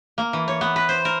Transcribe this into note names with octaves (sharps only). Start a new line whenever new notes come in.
A#3
E3
C#5
B3
B4
C5
A#4